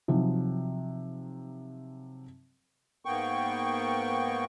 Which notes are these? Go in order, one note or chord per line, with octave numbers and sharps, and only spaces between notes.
C3 F3 F#3 D#4
G#2 A#3 B3 G5 C#6